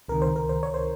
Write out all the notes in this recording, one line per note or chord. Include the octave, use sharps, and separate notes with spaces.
C#2 C3 D#3 A#4
C5
A#4
C5
C#5
C5